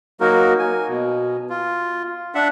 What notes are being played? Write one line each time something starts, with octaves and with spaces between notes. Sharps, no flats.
F#3 A#3 D#4 F#4 A#4
G#5
B2
F4
D4 E5 F#5